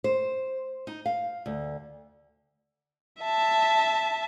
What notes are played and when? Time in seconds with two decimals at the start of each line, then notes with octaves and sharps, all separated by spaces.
0.04 C5
0.87 D#4
1.06 F5
1.46 D2
3.21 E5 A5